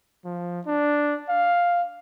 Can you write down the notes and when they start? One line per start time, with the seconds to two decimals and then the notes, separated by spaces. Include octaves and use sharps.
0.25 F3
0.66 D4
1.29 F5